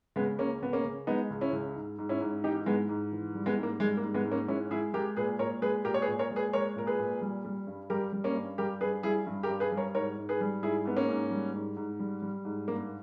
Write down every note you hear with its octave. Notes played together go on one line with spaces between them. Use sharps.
C#3 G#3 B3
C#2 A#3 C#4
C#2 B3
A#3 C#4
C#3
G#3 B3 D#4
C#2
C#4 E4
C#2
G#2
G#2
C#4 E4
G#2
E3 D#4 G4
G#2 G#3 B3
G#2
E3
G3
G#3 B3
G#2
A#3
G3 G#3
A#3
G#2
G#3 B3
G#2
A#3 C#4
G#3 C#4 E4
G#3 E4 G#4
G#3 G4 A#4
A#2 G#4 B4
A#2 A#4 C#5
G#3 G#4 B4
A#2 G4 A#4
C#5
G#4 B4
A#2
A#4 C#5
G#3
G#4 B4
G#3 A#4 C#5
A#2 A#4
G#4 B4
A#2
G3
G3
G2
G3 G4 A#4
G3
A#3 C#4
G2
G3 G4 A#4
G2 G#4 B4
G3 E4 G#4
G2
G4 A#4
G2
G#4 B4
G3
A#4 C#5
G#2 A#4 C#5
G#2
G#4 B4
G3
G#2 E4 G#4
G#2 B3
A#3 C#4
G#2
G3
G#2
G#2
G3
G3
G#2
G2 A#3